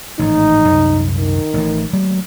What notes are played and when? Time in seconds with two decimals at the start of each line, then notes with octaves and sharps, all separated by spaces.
0.19 A1 G#2 D#3 D#4
0.68 C2 F#2
1.18 D#3
1.54 A1 A2
1.93 F#3 A3 A#3